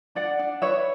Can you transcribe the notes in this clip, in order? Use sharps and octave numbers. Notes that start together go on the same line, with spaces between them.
D4 D5 F#5
D4
B4 C#5 E5